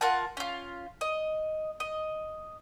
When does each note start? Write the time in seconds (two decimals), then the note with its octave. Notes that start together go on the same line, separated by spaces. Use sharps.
0.01 F4 A#4 F#5 A5
0.37 C#4 F4
1.01 D#5
1.80 D#5